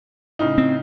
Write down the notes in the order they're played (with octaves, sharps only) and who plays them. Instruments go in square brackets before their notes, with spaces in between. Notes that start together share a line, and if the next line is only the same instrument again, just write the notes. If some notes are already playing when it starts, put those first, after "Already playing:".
[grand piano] A2 C#3 D#4
[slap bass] C4